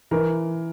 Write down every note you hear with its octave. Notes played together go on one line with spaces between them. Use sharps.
E3 A#4